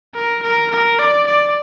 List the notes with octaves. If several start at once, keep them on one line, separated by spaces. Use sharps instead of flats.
A#4
A#4
A#4
D5
D5